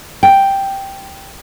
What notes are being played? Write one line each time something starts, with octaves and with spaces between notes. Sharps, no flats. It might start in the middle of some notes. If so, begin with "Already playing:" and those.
G5